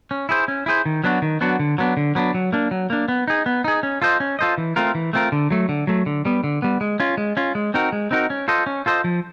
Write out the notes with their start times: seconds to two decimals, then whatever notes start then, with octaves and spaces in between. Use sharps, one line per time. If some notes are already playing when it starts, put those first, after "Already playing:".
0.11 C#4
0.29 E4 G#4 C5
0.48 C#4
0.66 E4 G#4 C5
0.86 D#3
1.04 F#3 B3 D4 F#4
1.22 D#3
1.41 F#3 B3 D4 F#4
1.59 D3
1.78 F#3 B3 D4
1.97 D3
2.15 F#3 B3 D4
2.34 F#3
2.53 A#3 D4
2.71 F#3
2.90 A#3 D4
3.08 B3
3.28 D#4 G#4
3.46 B3
3.64 D#4 G#4
3.83 C#4
4.02 F4 A4 C5 D#5
4.20 C#4
4.39 F4 A4 C5 D#5
4.58 E3
4.76 A3 C4 F4 A#4
4.95 E3
5.13 A3 C4 F4 A#4
5.32 D3
5.51 F#3 A3
5.69 D3
5.87 F#3 A3
6.06 D3
6.25 G3 B3
6.44 D3
6.62 G3 B3
6.81 G#3
7.00 C#4 F4
7.17 G#3
7.37 C#4 F4
7.55 G#3
7.74 C4 D#4 F#4 A#4
7.92 G#3
8.11 C4 D#4 F#4 A#4
8.30 C#4
8.48 F4 A4 C5 D#5
8.66 C#4
8.86 F4 A4 C5 D#5
9.04 F3